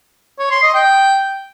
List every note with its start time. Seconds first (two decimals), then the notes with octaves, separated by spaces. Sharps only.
0.39 C#5
0.51 C6
0.63 D#5
0.75 G5